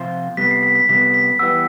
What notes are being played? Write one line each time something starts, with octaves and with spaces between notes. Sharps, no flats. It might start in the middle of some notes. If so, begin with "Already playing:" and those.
Already playing: C3 F3 C4 F4 C5
C3 G3 B3 B6
C7
B6
B6
C3 G3 B3 B6
B6
E3 G3 B3 E6